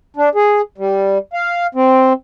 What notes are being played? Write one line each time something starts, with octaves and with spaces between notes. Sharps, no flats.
D4
G#4
G3
F5
C4